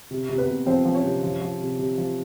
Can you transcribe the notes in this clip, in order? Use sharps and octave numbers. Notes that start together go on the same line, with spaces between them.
C3
C3
B3 B4
C3
F3 C4 C5
F3
C#4 C#5
C3
F3
F3
C3
C3
F3